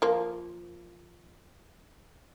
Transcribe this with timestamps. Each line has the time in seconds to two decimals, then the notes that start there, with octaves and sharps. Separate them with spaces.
0.02 F3 A#3